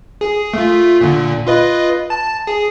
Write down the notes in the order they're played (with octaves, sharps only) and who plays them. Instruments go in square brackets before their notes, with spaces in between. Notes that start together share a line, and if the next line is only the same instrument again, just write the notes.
[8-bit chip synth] G#4
A3 F4
A#2 D3
F4 B4 D#5
A5
G#4